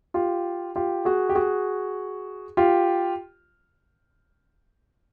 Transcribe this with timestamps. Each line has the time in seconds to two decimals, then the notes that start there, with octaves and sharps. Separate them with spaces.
0.14 F4 G4
0.76 F4 G4
1.05 F#4 G#4
1.29 G4
1.35 F#4 G#4
2.57 F4 G4